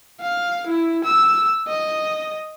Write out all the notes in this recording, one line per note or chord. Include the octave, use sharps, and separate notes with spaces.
F5
E4
E6
D#5